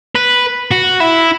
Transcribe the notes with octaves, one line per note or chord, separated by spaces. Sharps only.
B4
F#4
E4